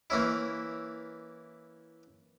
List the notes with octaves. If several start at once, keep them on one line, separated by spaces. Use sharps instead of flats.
E3 A#3 C#4 E4